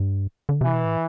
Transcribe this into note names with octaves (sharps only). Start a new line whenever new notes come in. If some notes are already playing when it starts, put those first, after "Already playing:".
Already playing: G2
D3
C3 E3
B2
A2